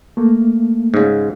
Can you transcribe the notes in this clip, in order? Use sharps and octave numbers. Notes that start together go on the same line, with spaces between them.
A3 A#3
G#2 C#3